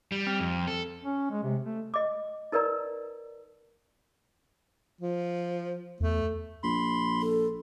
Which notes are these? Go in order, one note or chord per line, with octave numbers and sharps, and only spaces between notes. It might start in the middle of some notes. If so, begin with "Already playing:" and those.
G3
C4
F2
A4
C#4
G#3
C3
A3
D#5 D6
D#4 A#4 B4 D5 A#5
F3
E2 A3
A#1 B5 C6
A4